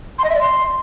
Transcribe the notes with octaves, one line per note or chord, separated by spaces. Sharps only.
C6
D#5
E5
D5
C6